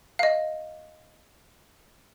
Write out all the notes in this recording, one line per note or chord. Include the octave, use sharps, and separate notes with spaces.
D#5 F5